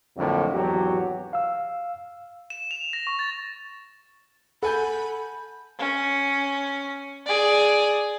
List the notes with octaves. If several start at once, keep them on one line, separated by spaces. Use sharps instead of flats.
F2 A2 D3 F#3 A#3
G#1 E2 F#3 F#4 G4
F5 E6
E7
F7
A#6
C#6
A6
A4 F#5 G#5 B5 G6
C#4
G#4 D5